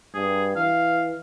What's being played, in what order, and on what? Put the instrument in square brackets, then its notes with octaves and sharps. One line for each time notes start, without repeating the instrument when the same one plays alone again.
[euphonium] G2 [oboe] G#4
[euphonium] E3 [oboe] F5